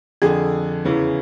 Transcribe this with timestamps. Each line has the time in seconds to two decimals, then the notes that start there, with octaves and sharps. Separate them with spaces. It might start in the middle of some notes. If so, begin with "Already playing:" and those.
0.22 F2 D3 G#4
0.85 E2 C#3 E3